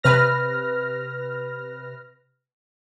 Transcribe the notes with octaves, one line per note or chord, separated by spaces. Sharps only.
C3 B4 F6 A#6